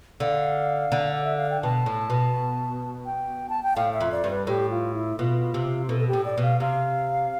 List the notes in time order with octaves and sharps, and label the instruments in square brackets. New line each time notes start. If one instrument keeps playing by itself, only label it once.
[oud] D3 [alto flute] F5
[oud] D3
[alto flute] D5
E5
F5
G5
[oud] B2 [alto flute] A5
[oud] A2
B2
[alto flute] G5
A5
G5
[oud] A2 [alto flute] F5
[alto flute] E5
[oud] F2
[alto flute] D5
[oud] G2
[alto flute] B4
[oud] A2 [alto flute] G4
[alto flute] F4
E4
[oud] B2 [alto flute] F4
[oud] C3
[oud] B2 [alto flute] A4
[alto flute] A4
G4
[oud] A2
[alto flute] D5
[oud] B2
[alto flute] F5
[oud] C3 [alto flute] F5